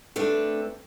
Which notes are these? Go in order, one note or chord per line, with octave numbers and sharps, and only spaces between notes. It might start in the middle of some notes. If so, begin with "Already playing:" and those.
A3 C4 D4 A4 B4